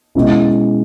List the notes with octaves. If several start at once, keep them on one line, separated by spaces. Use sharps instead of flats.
B2 G#3 C#4 E4